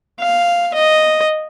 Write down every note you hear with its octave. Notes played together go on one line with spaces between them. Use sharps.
F5
D#5